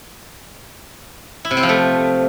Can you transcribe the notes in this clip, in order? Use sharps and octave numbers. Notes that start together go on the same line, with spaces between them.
E4
C3
C4
F3
A3